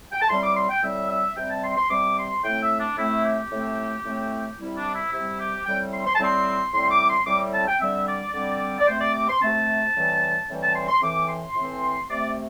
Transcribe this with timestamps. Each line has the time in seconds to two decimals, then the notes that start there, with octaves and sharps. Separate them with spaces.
0.12 G5
0.21 A5
0.29 A2 G3 C4 C6
0.42 D6
0.56 C6
0.70 G5
0.83 A2 G3 C4 E5
1.10 E5
1.36 C3 G3 C4 G5
1.50 A5
1.64 C6
1.77 C6
1.90 C3 G3 C4 D6
2.18 C6
2.44 A2 A3 C4 G5
2.62 E5
2.80 D4
2.97 A2 A3 C4 E4
3.25 G4
3.52 A2 A3 C4
4.05 A2 A3 C4
4.58 C3 G3 C4 E4
4.77 D4
4.94 E4
5.12 C3 G3 C4 E4
5.39 G4
5.65 A2 G3 C4 G5
5.92 C6
6.06 C6
6.15 A5
6.19 A2 G3 C4 C6
6.73 A2 G3 C4 C6
6.91 D6
7.09 C6
7.26 A2 G3 C4 D6
7.54 A5
7.68 G5
7.80 D3 G3 C4 E5
8.07 D5
8.34 D3 G3 C4
8.80 D5
8.88 C3 A3 C4 C5
9.01 D5
9.15 D6
9.28 C6
9.41 C3 A3 C4 A5
9.95 A2 E3 G3 C4
10.49 A2 E3 G3 C4
10.62 A5
10.75 C6
10.89 C6
11.02 A2 E3 C4 D6
11.29 C6
11.56 A2 E3 C4
12.10 C3 A3 C4 D5